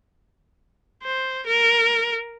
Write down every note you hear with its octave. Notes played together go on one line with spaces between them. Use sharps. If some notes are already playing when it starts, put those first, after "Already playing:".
C5
A#4